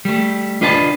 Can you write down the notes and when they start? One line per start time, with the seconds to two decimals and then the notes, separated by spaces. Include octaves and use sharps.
0.05 G3 A3
0.61 D4 F4 B4 D#5 G#5 A5